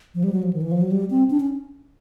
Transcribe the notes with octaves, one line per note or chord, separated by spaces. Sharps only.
F3
G3
F#3
F3
D#3
E3
F3
F#3
G3
C4
D4
C#4